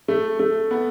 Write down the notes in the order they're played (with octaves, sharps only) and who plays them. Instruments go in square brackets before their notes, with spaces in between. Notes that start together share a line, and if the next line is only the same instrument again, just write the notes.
[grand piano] A3
A3
B3